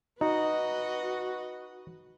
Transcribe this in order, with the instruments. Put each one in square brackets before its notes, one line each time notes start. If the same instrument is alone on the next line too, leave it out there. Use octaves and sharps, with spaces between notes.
[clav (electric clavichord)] D#4 [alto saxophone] F#4 [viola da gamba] B4 D#5